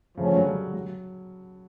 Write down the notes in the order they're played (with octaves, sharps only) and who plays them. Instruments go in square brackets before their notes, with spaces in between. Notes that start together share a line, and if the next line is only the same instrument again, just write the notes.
[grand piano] C#3 [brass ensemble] F3 A3 C#4
[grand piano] D3
F#3
G3
F#3